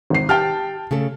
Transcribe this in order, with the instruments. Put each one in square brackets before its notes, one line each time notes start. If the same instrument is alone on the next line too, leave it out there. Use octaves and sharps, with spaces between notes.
[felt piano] G#1 C7
[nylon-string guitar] G4 [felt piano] G5 A5 F6
[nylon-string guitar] C#3 A3 A4